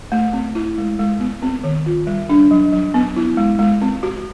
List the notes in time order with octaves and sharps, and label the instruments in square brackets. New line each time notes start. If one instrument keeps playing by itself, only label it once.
[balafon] A3
C4
E4
G#3
G#3
B3
C4
D#3
F4
G3
D4
F#3
F#3
B3
E4
G#3
G#3
C4
F#4